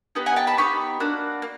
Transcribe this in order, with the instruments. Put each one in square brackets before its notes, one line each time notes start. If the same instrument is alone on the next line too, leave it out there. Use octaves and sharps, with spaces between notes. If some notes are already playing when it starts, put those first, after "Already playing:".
[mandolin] B3 D#4 G4
F#5 G#5
G5 A5
A5 B5
B3 D#4 G4 B5 C#6
A#3 D4 F#4
A#3